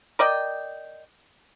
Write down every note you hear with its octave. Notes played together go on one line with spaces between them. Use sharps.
A#4 D5 D#5 G5